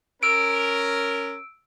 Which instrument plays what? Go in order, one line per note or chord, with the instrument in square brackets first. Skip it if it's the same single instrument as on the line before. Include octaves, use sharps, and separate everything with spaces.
[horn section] C#4 A#4 [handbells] E6 D7